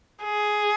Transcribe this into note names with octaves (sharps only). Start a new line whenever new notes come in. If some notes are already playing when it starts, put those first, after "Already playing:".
G#4